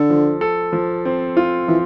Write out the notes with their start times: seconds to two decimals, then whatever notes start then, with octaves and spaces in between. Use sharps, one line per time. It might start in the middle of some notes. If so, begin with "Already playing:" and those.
Already playing: D3 A4
0.10 F3
0.41 A4
0.73 F3
1.05 C4
1.37 F4
1.68 E3 F3